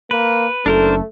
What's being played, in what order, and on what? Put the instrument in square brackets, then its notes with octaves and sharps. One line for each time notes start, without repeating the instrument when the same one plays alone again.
[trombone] A#3 [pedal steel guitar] B4
[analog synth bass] F#1 [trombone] A3 [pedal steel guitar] D4 A#4 C5 [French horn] A4